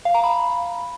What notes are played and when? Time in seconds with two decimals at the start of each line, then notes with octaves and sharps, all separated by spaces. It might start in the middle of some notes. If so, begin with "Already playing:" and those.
0.05 F5
0.14 A#5
0.24 B5